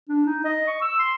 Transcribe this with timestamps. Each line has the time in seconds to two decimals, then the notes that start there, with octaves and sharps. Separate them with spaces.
0.09 D4
0.26 D#4
0.44 D#5
0.67 C#6
0.81 E6
0.99 C6